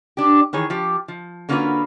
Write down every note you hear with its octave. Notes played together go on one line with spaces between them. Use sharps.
D4 G4
D#3 E3 G#4 C#5
F3 G4
F3
D3 A#3 C#4 F4 F#4 B4